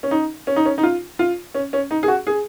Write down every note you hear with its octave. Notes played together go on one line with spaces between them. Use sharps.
C#4
D#4
C#4
D#4
C#4
D#4
F4
F4
C#4
C#4
D#4
G#4
F#4
G#4